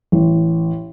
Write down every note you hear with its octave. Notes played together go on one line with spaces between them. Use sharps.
A1